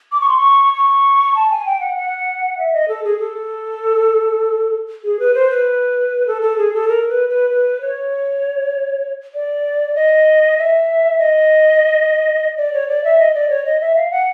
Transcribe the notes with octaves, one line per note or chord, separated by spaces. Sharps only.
D6
C#6
C6
C#6
C#6
A5
G#5
G5
F#5
F#5
E5
D#5
A4
G#4
A4
G#4
B4
C5
B4
A4
A4
G#4
A4
A#4
B4
B4
B4
C#5
D5
D#5
E5
D#5
D5
C#5
D5
E5
D#5
D5
C#5
D#5
E5
F5
F#5